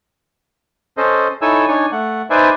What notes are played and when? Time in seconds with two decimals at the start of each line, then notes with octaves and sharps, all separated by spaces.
0.97 C#4 A4 C5 D#5
1.42 D#4 E4 A4 C#5 G#5 E6
1.68 D4 D#4 C#5 G#5
1.92 A3 F#5
2.30 D#4 B4 C5 D5 E5 G#5